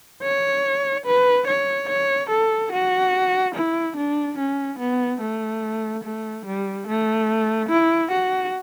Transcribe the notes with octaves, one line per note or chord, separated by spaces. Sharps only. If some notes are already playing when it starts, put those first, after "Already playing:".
C#5
B4
C#5
C#5
A4
F#4
E4
D4
C#4
B3
A3
A3
G3
A3
E4
F#4